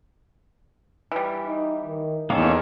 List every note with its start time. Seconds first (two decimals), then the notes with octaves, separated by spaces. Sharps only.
1.12 E3 G3
1.47 D#4
1.86 D#3
2.30 E2 D#3 A#3 C#4 D#4 A4